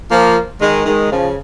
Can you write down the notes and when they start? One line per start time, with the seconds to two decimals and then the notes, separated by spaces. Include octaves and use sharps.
0.10 F3 A#3
0.61 D#3 G#3
0.86 D#3 G#3
1.11 C#3 F3